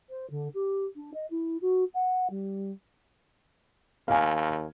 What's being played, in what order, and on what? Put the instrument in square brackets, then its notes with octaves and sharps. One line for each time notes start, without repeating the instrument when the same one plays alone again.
[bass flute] C5
D3
G4
D4
D#5
E4
F#4
F#5
G3
[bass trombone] D#2 [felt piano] F5 G#5